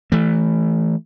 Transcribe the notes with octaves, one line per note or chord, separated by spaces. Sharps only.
E3 A3